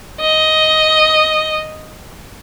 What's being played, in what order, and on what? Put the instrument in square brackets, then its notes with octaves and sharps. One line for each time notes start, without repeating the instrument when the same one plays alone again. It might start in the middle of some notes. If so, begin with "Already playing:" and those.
[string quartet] D#5